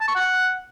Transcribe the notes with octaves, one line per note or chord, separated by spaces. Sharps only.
A5
C#6
F#5